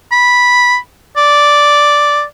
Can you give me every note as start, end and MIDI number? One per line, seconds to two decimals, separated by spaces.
0.12 0.77 83
1.17 2.23 74